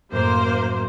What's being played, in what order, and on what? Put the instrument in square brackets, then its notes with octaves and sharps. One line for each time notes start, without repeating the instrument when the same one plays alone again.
[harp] F#2 A2 [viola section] A#3 C5